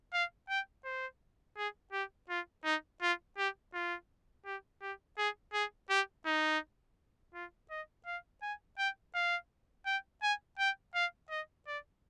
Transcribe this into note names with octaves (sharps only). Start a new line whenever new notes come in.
F5
G5
C5
G#4
G4
F4
D#4
F4
G4
F4
G4
G4
G#4
G#4
G4
D#4
F4
D#5
F5
G#5
G5
F5
G5
G#5
G5
F5
D#5
D5